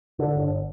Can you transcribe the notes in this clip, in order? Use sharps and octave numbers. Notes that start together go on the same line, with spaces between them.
D3
G1